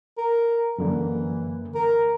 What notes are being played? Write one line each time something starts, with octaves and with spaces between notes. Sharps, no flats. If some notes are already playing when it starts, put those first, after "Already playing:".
A#4
F#2 D3 E3 A#3
A#4